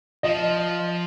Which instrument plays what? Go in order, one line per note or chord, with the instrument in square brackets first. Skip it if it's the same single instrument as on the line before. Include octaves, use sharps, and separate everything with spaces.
[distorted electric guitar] F3 [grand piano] D#5